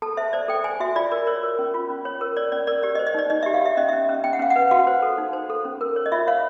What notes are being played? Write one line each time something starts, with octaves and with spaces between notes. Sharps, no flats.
A4 A5
C5 E5
C5 D5
A4 G5
C5 G#5
F#4 E5
F4 D5
A#4 D5
A#4 C#5
A#4
C#4
F4
C#4
C#5
A#4
C#5 D5
C#4 D5
A#4 D5
G4 D5
D#5
C5
D#5
D#4 D5
D#4 D#5
E5
G4
F5
G4 E5
C#4 D#5
C#4 E5
C#4
C#4 G5
F#5
C#4 F5
F#5
B4
F#4 F5
C5
A4
D#4
C5
A4
C#4
A#4
C#5
D#5
F4 E5
C#5 F5